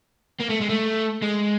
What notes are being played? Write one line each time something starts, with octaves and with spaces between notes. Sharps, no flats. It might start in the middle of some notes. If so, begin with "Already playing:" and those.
A#3
A3
G#3
A3
G#3